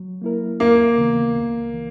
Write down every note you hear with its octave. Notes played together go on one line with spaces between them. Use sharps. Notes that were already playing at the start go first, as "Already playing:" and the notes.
Already playing: F#3
A#3 E4 A#4
D#2 A#3
C#3 E3 B3
C#2
E3